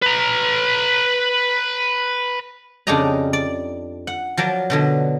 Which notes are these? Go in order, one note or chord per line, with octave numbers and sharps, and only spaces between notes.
B4 A#5
F2 C#3 D4 G4 D#5 A#5
D5
F#5
F3 F#3 A#4 D5
B2 D3 F#3